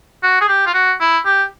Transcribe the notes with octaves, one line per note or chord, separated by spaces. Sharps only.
F#4
G#4
G4
F4
F#4
E4
G4